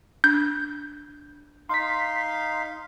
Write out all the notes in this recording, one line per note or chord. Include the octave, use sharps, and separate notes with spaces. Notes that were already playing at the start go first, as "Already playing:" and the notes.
D4 G6
D#4 F5 C6 B6